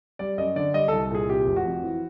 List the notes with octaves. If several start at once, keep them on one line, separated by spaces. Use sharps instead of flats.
G3 D5
F#2 D#5
D3 D5
G3 D#5
C2 A4
A#2 G#4
C3 G4
F1
F#4
F2
E3